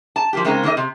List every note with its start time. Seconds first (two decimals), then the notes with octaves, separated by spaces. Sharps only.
0.16 A5
0.33 F3 A#3 G4
0.44 C#3 G#3 A#3 C4 D#4
0.63 D#3 A#3 A#4 D#5
0.77 C3